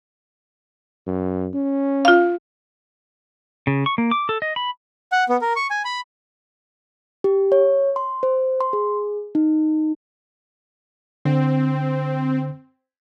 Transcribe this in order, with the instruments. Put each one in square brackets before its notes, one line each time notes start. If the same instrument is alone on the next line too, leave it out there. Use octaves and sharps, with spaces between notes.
[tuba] F#2
C#4
[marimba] F4 F5
[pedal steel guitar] C#3
C#6
A#3
D6
A4
D#5
B5
[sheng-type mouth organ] F#5
B3
A#4
C#6
G#5
B5
[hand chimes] G4
C#5
C6
C5
C6
G#4
D#4
[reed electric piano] D3 [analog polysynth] C4